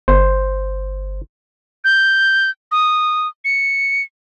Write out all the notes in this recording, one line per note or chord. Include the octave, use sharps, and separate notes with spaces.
G1 C5
G6
D#6
C#7